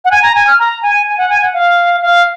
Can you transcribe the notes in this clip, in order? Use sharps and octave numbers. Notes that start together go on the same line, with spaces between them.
F#5
G#5
A#5
G#5
F6
A#5
G#5
G#5
F#5
G#5
F#5
F5
F5